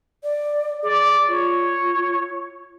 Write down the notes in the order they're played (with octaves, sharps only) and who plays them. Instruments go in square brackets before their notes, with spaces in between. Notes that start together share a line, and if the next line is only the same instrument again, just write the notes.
[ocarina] D5
[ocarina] G#4 [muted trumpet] D5
[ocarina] F4 [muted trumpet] C#5